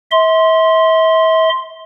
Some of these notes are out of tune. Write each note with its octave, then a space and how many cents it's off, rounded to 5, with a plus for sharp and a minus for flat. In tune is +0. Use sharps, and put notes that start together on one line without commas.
E5 -35 C6 +0